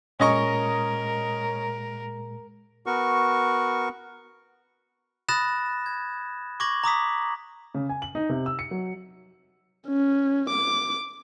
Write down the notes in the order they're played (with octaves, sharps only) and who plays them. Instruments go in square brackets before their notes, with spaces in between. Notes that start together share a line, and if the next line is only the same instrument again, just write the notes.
[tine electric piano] A#2 G#3 [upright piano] C#4 D#5 C#6 [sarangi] A#4
[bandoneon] B3 F#4 A#4 C#6
[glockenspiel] B5 D#6 F#6 A6 A#6 E7
G#6
C#6 D6 G#6 A#6 F#7
A#5 D6 D#6 B6
[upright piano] C#3
G#5
F#7
D#4
C3
E6
C#7
F#3
[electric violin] C#4
D6